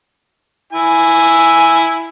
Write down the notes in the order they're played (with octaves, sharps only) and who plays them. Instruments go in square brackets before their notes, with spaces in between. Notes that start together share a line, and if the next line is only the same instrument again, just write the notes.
[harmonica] E4 G#5